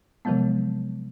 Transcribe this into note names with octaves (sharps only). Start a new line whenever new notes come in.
C3 D#3 F3 F#3 G#3 B3